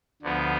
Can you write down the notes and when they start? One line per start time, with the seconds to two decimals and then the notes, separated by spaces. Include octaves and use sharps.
0.22 D2 D3 F3 B3